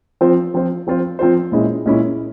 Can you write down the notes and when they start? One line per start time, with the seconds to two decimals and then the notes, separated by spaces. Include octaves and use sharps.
0.21 F3 C4 F4 C5
0.54 F3 C4 F4 C5
0.87 F3 C4 F4 C5
1.19 F3 C4 F4 C5
1.52 A#2 G#3 C#4 E4
1.86 A#2 G#3 C#4 E4